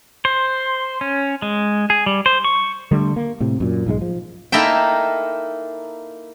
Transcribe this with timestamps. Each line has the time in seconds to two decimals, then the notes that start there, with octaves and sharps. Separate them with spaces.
0.25 C5
1.01 C#4
1.42 G#3
1.90 G#4
2.06 G3
2.26 C5
2.44 C#6
2.91 D3 G3 A3
3.16 A#3
3.40 A2 C3
3.60 F#2 A#2
3.86 B1 G#2 E3 G#3
4.01 F3
4.52 A#3 D#4 E4 A4 E5 G5